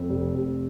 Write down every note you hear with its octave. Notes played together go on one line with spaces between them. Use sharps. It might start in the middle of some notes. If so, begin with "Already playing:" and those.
Already playing: F2 C4
F1
F1